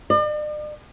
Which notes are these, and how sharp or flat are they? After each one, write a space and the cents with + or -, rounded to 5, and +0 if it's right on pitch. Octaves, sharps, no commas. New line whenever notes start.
D5 +45